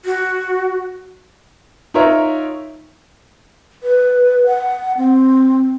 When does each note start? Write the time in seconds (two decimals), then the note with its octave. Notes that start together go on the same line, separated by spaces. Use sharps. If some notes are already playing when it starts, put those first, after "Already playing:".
0.05 F#4
1.94 D#4 F4 A#4 C#5 E5
3.83 B4
4.46 F#5
4.98 C4